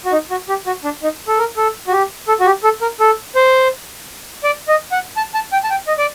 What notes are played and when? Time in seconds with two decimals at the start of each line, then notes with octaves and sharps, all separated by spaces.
0.05 F#4
0.12 D#4
0.30 F#4
0.49 G4
0.66 F#4
0.84 D4
1.03 D#4
1.27 A4
1.39 A#4
1.57 A4
1.87 F#4
1.92 G4
2.28 A4
2.40 F#4
2.46 G4
2.64 A4
2.82 A#4
3.00 A4
3.35 C5
4.44 D5
4.68 D#5
4.92 F#5
5.16 A5
5.34 A5
5.52 G5
5.64 A5
5.70 G5
5.87 D#5
5.98 D5